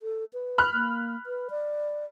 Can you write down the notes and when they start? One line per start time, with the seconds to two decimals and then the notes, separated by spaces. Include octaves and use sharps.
0.01 A4
0.33 B4
0.58 B5 F6 F#6
0.74 A#3
1.26 B4
1.50 D5